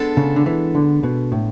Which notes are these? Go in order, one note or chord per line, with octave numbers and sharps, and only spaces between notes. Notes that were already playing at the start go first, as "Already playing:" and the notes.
Already playing: G#3 B3 D4 A4
C#3
D3
E3
D3
B2
A2